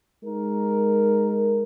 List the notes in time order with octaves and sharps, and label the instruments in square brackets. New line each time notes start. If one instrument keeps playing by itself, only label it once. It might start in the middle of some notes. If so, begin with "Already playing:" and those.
[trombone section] G#3 D#4 A#4